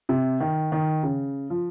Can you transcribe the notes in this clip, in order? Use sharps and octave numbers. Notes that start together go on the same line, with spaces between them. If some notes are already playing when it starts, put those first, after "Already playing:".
C3
D#3
D#3
C#3
F3